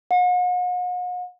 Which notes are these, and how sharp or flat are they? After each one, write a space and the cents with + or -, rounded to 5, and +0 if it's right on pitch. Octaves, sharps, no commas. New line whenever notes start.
F#5 -45